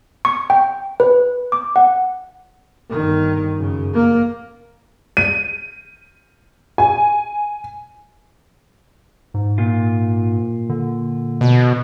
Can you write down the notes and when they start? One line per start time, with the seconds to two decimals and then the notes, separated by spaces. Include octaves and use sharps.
0.25 C#6
0.50 G5
1.00 B4
1.52 D6
1.76 F#5
2.90 G1 D#3
3.57 F#2 C#3
3.94 A#3
5.17 D#7
6.78 G#5
9.34 G#2
9.58 A#2 F4
10.69 D3
11.41 B2